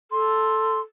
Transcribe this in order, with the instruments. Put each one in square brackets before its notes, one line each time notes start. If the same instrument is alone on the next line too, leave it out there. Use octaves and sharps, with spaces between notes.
[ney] A4 [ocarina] C6